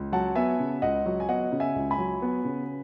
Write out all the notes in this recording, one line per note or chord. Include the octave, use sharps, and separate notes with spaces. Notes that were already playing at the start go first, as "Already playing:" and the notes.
Already playing: C#2
F#3 F#5 A5
B3 E5 G#5
C#3
C#2 D#5 F#5
F#3
G#5
B3 D#5 F#5
C#3
E5 G#5
C#2
G#5 B5
F#3
B3
C#3